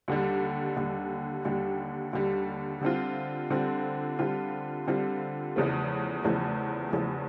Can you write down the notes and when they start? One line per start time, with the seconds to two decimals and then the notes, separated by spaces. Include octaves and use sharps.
0.08 D#2 D3 G3
0.76 D#2 D3 G3
1.45 D#2 D3 G3
2.13 D#2 D3 G3
2.81 D3 G3 C4 F4
3.50 D3 G3 C4 F4
4.19 D3 G3 C4 F4
4.87 D3 G3 C4 F4
5.56 F1 E2 C#3 F3 A3
6.24 F1 E2 C#3 F3 A3
6.92 F1 E2 C#3 F3 A3